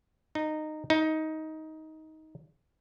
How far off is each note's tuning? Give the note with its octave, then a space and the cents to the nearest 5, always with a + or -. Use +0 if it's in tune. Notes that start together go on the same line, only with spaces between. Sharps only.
D#4 -15
D#4 +15